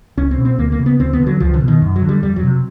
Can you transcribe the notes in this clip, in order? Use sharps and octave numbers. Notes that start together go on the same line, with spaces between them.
C#2 C#4
C4
B2
C4
D2 A#3
A#3
C#3
B3
D2 C4
B3
D3
F#3
C#2 F3
D3
B2
D#3
F#2
F#3
D3
G3
F2 G3
F#3
C3